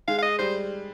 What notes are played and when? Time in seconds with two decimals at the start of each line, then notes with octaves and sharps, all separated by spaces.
0.07 G#3 F5
0.18 F5
0.22 D#5
0.39 G3 C5